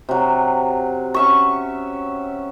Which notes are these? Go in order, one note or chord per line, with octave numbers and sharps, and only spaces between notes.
C3 F#3
C#4 E5 C#6